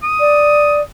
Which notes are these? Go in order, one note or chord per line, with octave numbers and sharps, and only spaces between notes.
D#6
D5